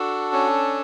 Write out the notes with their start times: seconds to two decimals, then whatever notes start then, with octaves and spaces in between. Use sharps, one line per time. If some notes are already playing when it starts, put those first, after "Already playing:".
Already playing: D4 F#4 A4
0.33 C#4